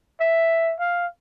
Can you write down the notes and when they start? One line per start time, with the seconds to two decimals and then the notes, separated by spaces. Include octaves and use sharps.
0.21 E5
0.80 F5